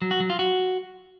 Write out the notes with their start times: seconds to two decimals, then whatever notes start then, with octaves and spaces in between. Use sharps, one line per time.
0.02 F#3
0.11 F#4
0.20 F#3
0.30 F4
0.39 F#4